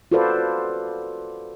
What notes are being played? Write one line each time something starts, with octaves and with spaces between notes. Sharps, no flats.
F4 F#4 A4 B4 C5 D5